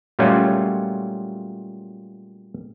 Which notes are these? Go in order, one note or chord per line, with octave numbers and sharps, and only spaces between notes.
A#2 F#3 G3 A3 C#4 F4